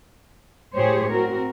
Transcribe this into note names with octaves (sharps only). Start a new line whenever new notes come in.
A2 G4 G#4 C5 C#5
C4 F#4 A#4